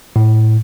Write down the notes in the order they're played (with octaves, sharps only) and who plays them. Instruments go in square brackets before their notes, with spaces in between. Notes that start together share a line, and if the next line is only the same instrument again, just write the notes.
[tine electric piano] A2